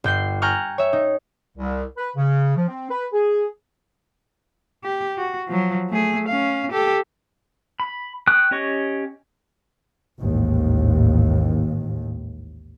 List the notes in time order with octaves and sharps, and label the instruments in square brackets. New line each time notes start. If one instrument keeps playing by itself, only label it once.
[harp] G1 G5 G6 C7
G5 G#5 A#5 C#6 F6 F#6
C#5 E5
D#4
[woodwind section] C2
B4
C#3
F3
C4
B4
G#4
[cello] G4
F#4
F3 F#3
A3 G#4
C#4 F5
G4 A4
[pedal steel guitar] B5
G5 C#6 D#6 F#6
C#4 G4 C#5 D#5 C#6
[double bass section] A1 D#2 G#2